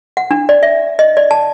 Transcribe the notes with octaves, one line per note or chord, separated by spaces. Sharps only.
F#5
D4
D5
E5
D#5
D5
A5